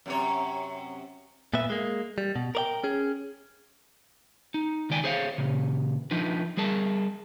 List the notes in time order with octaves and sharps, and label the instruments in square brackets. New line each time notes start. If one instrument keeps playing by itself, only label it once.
[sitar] F#2 C3 C#5
[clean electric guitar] A#2 B3 B4 E5
G#3 A#3
G3
B2
A#4 D5 G5
C#4 G#4
D#4
C#2 D#3 D5 G5 G#5
G#4 C5 C#5 E5 F5
A#2 C#3
F3 D4 D#4 B4
G3 G#4 A#4 A5